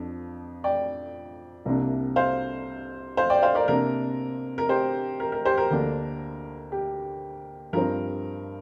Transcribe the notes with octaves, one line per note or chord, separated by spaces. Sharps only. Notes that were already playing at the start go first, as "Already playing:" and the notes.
Already playing: F2 F3 D4
D5 G5
C2 C3 A#3 D4
C5 F5
C5 F5
D5 G5
C5 F5
A#4 D5
C3 A#3 D4 A#4
A#4
G4 C5
A#4
A#4
G4 C5
A#4
D2 D3 A#3 D4
G4
G2 F3 C4 A#4